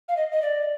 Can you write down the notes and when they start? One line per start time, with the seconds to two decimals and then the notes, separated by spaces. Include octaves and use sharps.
0.08 F5
0.17 D#5
0.32 D#5
0.42 D5